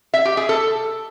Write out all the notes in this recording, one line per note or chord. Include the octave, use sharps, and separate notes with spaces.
E5
G4
G#4
A4